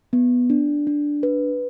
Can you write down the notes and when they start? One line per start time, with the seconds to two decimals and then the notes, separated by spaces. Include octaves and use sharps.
0.13 B3
0.50 D4
0.87 D4
1.23 B4